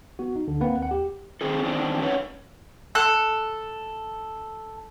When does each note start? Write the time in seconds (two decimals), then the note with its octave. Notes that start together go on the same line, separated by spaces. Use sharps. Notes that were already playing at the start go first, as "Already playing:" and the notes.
0.19 B3 F#4
0.36 D#4
0.48 D2 D3
0.61 A#3 C4 B4 F#5
0.78 D#2 F#5
0.91 G4
1.41 C3 D#3 A3 C4 G#4 A4
1.63 E2 D#3 C4 D4
2.01 C#4 B4 C#5 F#5
2.95 A4 F#6